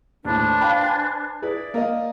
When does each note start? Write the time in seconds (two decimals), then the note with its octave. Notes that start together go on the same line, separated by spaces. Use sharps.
0.25 D#2 A2 D4 B4 C5
0.61 F5 G5 B5
0.85 G#5
1.42 E4 G#4 B4 D5
1.74 A#3 A#4 D#5